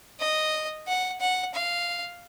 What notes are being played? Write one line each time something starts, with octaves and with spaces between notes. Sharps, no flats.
D#5
F#5
F#5
F5